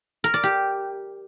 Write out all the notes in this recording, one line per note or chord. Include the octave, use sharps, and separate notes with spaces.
A#4
D5
G4